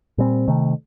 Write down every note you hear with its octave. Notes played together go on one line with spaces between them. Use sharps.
A#2 G3 C4
C3 D#3 A3